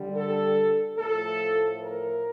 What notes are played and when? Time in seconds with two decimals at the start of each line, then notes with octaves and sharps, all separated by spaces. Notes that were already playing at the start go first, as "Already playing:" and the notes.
Already playing: D3 G3
0.14 A4
0.97 A2 F3 A3 A4
1.80 A#4